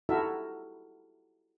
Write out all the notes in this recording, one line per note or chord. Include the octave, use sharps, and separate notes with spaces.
E4 F#4 G4 A4 A#4 E5